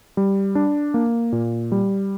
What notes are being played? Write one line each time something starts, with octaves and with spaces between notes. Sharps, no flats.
G3
D4
A#3
A#2
G3